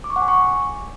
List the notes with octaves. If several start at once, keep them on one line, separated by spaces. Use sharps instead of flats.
D6
C#6
F#5
G#5
C#6